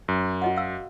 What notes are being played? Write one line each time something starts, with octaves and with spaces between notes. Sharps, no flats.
F#2
F#4 D#5 F#5
F5 E6